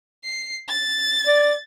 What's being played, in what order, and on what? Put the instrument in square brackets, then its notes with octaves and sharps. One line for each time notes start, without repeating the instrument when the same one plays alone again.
[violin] C7
A6
[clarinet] D5